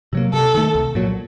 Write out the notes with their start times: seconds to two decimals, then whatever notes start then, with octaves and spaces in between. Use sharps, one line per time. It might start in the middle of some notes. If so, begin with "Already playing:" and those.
0.13 C3 F#3 A#3
0.33 C3 A4
0.54 D#3 A3
0.75 C2
0.95 A#2 F#3